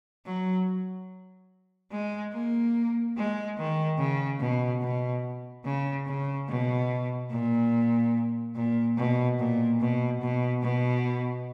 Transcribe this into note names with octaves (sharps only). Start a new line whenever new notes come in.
F#3
G#3
A#3
G#3
D#3
C#3
B2
B2
C#3
C#3
B2
A#2
A#2
B2
A#2
B2
B2
B2